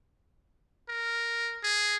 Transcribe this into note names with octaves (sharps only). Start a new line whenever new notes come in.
A#4
G#4